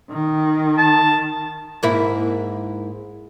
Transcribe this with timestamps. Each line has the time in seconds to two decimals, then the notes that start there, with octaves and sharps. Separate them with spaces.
0.10 D#3
0.78 A5
1.83 G#2 A#3 E4